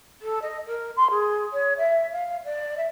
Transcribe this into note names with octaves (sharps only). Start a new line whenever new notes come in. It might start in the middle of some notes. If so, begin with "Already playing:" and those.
A4
D#5
A#4
C6
G#4
C#5
E5
F5
D5
E5